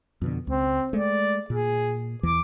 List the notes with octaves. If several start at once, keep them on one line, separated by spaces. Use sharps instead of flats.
F2 B2 D3
C#2 C4
G#3 A3 D5
A#2 G#4
E2 E3 D6